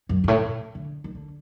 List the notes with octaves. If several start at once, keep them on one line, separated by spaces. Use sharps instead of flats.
F#2
G2
A2
A#2
D3
D#3
D3